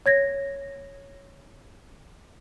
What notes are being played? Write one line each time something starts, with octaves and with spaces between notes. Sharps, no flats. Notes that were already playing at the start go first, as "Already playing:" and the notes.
C#5 G#6 A#6